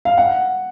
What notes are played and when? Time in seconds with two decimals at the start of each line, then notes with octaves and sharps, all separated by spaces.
0.05 F5
0.18 F#5